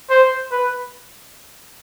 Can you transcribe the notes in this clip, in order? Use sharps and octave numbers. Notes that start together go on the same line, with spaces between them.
C5
B4